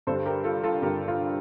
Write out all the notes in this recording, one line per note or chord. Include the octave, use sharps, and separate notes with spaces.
G2 D3 G3 A4 C5
G4 A#4
F4 A4
F4 A4
G2 D3 G3 G4 A#4
F4 A4